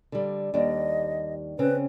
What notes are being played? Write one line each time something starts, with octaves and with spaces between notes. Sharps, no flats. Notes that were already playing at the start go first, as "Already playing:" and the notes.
D3 G3
D#2 G3 D4 D#5
C#3 C4 C#4 B4